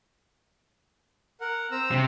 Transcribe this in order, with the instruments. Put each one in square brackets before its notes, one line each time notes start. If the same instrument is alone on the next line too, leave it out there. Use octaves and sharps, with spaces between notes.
[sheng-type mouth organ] A#4 F#5
C4 A#5 E6
[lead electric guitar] C3